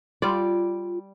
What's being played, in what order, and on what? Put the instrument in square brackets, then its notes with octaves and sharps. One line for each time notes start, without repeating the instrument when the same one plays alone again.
[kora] G3 D5 [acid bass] F4